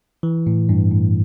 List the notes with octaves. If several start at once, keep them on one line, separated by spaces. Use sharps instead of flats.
E3
A2
G2
A2